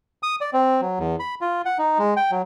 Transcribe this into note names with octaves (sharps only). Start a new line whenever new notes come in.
D#6
D5
C4
F#3
E2
B5
F4
F#5
D#4
G#3
G5
F#3